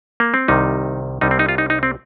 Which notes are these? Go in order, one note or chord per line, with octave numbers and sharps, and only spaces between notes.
A#3
C4
C2 C3 D#3 G3 D#4
C2 C3 G3 D#4
C4
D#4
F4
D#4
D#4
C4